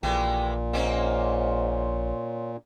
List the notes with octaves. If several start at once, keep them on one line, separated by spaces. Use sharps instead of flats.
A#1 A#2 E3 G#3 A3 G4
A#1 G#2 A#3 C4 C#4